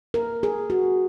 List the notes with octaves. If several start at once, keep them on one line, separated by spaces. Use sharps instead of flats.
A#4
G#4
F#4